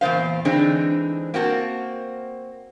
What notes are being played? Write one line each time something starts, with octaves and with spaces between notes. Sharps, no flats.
E2 A#2 G#3 C5 F5
D3 E3 G#3 C4 D4 D#4
A#3 C4 F#4 A5